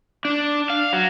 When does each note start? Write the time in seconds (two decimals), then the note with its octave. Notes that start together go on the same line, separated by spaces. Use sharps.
0.25 D4
0.70 F5
0.93 F#3